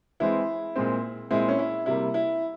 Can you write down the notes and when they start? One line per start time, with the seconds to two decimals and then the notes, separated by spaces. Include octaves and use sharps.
0.20 E3 G#3 C4 E4
0.76 A#2 G#3 C4
1.31 A#2 G#3 C4 E4
1.48 C#4
1.59 E4
1.86 C3 G3 A#3 E4
2.14 E4